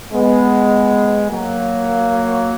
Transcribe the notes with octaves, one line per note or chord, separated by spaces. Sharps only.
G#3 B3
F#3 A#3